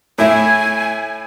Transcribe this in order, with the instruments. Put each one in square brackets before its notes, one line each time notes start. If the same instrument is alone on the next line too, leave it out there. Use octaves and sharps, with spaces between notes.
[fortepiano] A2 E4 [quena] G#5